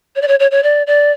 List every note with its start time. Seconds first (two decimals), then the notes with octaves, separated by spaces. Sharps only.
0.16 C#5
0.22 D5
0.28 C#5
0.40 C#5
0.51 C#5
0.63 D5
0.87 D5